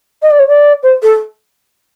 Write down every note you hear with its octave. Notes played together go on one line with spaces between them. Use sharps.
D#5
D5
C#5
D5
C5
A4